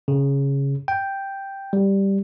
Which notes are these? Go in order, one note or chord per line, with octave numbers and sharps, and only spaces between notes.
C#3
G5
G3